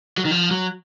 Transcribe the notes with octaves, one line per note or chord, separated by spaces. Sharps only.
F#3
D#3
F3
F#3